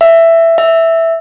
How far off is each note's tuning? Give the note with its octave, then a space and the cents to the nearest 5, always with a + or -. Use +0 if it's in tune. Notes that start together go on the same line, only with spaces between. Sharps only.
E5 +10
E5 +0